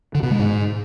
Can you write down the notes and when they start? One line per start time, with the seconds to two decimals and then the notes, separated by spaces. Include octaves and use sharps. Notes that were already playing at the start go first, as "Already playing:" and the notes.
0.15 D3
0.23 B2
0.31 G#3
0.39 G#2